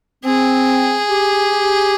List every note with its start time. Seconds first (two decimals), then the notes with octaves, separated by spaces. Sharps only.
0.25 C4 G#4
1.10 G4